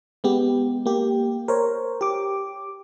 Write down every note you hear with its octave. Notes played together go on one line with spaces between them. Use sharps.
G#3 B3 G4
A#3 G4
A#4 C5 C#5
G4 D6